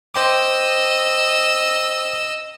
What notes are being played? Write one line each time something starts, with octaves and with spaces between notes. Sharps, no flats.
C5 D#5 G5 D6 E6